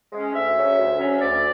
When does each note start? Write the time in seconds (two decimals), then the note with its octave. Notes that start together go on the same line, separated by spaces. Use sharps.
0.12 G#3 C#4
0.33 D2 E5
0.55 C#3 F#3 C#4
0.78 D2
0.99 C#3 F#3 C#4
1.10 E5
1.21 D2 D5